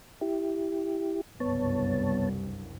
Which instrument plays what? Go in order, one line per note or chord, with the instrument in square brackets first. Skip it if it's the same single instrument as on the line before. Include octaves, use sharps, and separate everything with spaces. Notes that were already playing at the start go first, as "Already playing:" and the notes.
[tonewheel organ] E4 G4
[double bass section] F#1 C2 G2 [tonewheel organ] B3 C#5 A5